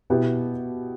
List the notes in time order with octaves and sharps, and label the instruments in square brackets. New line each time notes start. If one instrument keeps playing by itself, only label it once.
[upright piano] B2 B3 E4 G4